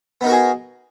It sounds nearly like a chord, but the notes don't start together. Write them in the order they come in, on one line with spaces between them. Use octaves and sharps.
B3 D#4 A#4 F#4 G#4